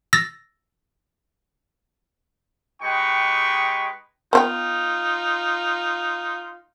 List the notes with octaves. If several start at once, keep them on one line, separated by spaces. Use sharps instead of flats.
E6 A6 A#6
G#3 D#4 G4 B4 G5 C#6
B3 D#4 F4 C5 G5